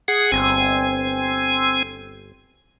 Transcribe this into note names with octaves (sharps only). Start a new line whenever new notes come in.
G#4 F#5
G1 C4 G#5